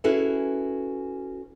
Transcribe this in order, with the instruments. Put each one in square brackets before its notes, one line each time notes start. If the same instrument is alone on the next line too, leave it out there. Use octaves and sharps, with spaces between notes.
[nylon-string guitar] C#4 E4 F#4 G#4 A4 B4